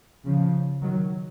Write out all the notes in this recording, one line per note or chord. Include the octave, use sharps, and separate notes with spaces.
C#3 F3
D#3 F#3